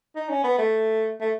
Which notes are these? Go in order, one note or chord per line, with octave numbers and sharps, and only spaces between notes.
D#4
C#4
B3
A3
A3